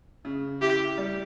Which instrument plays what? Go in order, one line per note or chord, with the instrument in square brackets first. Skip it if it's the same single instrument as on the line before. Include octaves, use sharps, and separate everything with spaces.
[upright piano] C#3
[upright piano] E4 [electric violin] G4
[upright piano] G3